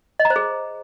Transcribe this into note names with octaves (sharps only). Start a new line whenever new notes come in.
D#5
A#5
C5
G#4